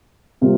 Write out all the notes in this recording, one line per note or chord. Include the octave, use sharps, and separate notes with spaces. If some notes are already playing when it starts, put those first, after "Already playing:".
C3 G3 A#3 F4